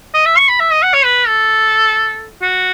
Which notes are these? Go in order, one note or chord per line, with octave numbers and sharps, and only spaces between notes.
D#5
E5
C#6
B5
E5
D#5
F#5
C#5
B4
A4
F#4